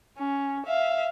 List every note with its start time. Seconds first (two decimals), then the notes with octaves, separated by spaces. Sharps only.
0.18 C#4
0.66 E5 F5